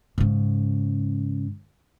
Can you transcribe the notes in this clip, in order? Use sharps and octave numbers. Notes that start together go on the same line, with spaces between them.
G#2 C#3